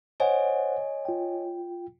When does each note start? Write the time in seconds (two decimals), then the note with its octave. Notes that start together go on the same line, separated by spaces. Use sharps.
0.20 C5 C#5 D#5 F#5 G#5
1.05 F4 G5